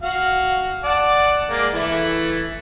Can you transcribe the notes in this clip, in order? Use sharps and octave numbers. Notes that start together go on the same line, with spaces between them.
F#4 F5
D5 F#5 A5
G#3 A#3 D5
E3 A3 E4